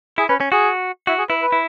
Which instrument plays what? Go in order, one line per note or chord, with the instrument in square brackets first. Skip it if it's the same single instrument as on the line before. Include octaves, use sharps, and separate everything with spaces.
[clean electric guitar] E4 [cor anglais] G#4
[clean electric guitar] C#4 [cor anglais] B4
[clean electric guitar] C#4
[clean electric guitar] F#4 [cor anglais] G#4
[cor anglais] E4 [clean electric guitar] F#4
[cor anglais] G#4
[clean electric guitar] E4 [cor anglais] B4
[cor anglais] B4
[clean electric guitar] E4